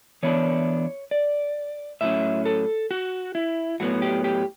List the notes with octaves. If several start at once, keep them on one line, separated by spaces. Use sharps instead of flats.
E3 B3 D4 C#5
D5
A2 F#3 C#4 E5
A4
F#4
E4
A2 F#3 B3 F#4
G4
G4